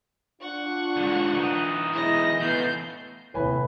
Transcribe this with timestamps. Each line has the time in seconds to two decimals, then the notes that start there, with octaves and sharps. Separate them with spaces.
0.41 D4 F4 F#5 C#6
0.96 G#2 D3
1.33 E3 D#4
1.92 B2 G#3 E4 D#5 A#6
2.40 E3 A3 B3 F4 G6 C7
3.34 D#1 D#2 A2 C3 B4 G#5 B5